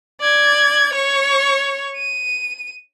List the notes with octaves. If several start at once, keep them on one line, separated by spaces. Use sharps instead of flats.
D5 G#6
C#5 C#6
D#7